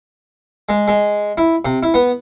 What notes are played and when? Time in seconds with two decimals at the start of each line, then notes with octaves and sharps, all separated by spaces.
0.69 G#3
0.88 G#3
1.38 E4
1.65 C3
1.83 E4
1.94 B3